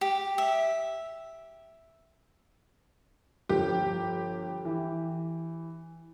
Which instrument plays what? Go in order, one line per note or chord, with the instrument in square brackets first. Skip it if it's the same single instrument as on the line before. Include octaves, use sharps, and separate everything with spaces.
[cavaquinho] G4
E5
[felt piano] G1 F3 [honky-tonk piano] G4
[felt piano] E3